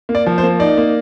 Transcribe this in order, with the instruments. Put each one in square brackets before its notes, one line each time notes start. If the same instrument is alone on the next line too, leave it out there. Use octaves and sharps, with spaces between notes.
[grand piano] A#3
D5
F3
C5
A#3
D#4 D5
A#3